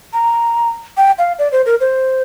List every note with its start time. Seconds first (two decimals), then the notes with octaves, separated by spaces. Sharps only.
0.13 A#5
0.97 G5
1.18 F5
1.39 D5
1.52 C5
1.66 A#4
1.80 C5